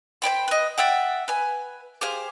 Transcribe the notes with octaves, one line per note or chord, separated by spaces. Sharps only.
C5 D5 G5 B5
B4 D#5
D5 E5 F#5 G5
B4 G#5
G4 G#4 C5 F5